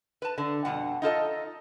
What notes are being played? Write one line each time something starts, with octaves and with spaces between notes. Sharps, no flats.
B4 A5
D3
F2 B2 G3 F#5
D#4 F4 A4 D#5